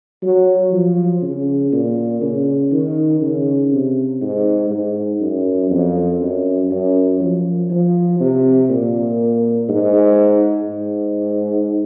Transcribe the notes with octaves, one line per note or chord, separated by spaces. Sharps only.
F#3
F3
C#3
A#2
C#3
D#3
C#3
C3
G#2
G#2
F#2
F2
F#2
F#2
F3
F3
C3
A#2
G#2
G#2